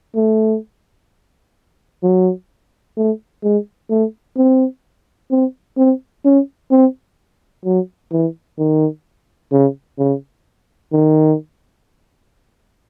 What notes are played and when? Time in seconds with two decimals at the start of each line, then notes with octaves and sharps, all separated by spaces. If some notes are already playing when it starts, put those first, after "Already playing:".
0.15 A3
2.03 F#3
2.97 A3
3.43 G#3
3.90 A3
4.37 C4
5.31 C4
5.77 C4
6.25 C#4
6.71 C4
7.65 F#3
8.12 E3
8.58 D#3
9.52 C#3
9.99 C#3
10.92 D#3